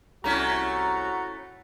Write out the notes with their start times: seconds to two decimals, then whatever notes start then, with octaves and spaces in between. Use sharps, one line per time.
0.24 C2 A3 C#4 E4 F#4 A#5